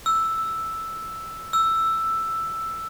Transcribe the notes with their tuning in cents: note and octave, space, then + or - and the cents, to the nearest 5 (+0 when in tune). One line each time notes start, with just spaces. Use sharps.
E6 +0
E6 +5